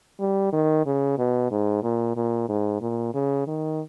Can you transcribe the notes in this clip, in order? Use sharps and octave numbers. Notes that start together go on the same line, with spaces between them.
G3
D#3
C#3
B2
G#2
A#2
A#2
G#2
A#2
C#3
D#3